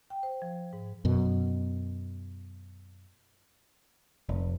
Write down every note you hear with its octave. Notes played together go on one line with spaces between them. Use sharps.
G5
C5
F3
G#2
F#2 B2
F1